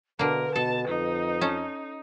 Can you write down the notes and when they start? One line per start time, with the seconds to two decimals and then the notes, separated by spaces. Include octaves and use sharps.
0.19 B2 D3 A#3 A#4 B4
0.56 B2 A4 A5
0.88 F2 D#4
1.41 C#4 A4